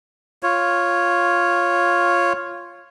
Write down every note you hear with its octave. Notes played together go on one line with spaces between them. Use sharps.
F4 C#5